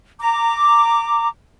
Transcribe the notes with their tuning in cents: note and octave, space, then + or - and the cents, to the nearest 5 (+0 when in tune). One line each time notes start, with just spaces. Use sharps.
A#5 -15 D6 +0